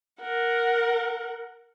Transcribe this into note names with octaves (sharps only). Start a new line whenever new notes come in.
A#4 F#5